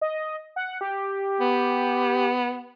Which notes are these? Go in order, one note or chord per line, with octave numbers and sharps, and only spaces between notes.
D#5
F#5
G4
B3